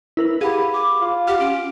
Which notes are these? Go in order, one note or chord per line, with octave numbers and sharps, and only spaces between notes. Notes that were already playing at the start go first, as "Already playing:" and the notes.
E4 A#4 B4
G4 G#4 F5 F#5 B5
D6
F4
G4 F#5 F6
C#4 D7